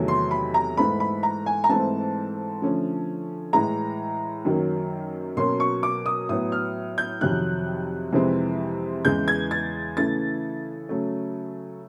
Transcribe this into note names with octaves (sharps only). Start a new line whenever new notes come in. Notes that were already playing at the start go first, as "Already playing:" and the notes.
Already playing: E2 C3 D#3 F#3 A3
C6
B5
A#5
G#2 E3 A3 B5
B5
A#5
G#5
A#5
G#2 E3 A3 C4 A5
D3 F3 A3 C#4
A2 E3 G#3 A#5
F#2 D#3 F#3 A#3
B2 F#3 A#3 C#4 C6
C#6
D6
D#6
A2 F#3 B3 D#6
F6
G6
F2 C3 D#3 F#3 F#6
F2 C3 E3 G#3 C4
E2 C#3 E3 G#3 G6
G#6
A6
C#3 E3 A3 A6
C#3 F#3 A3